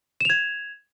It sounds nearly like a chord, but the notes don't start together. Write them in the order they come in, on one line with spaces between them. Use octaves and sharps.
E7 F7 G#6